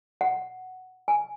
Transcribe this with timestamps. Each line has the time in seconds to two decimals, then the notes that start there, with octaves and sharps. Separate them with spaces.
0.21 F#5
1.08 G#5